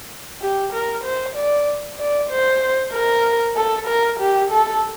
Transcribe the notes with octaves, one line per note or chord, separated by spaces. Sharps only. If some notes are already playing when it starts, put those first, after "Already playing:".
G4
A#4
C5
D5
D5
C5
A#4
A4
A#4
G4
A4